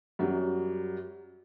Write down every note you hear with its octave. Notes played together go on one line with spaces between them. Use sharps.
F#2 F#3 G3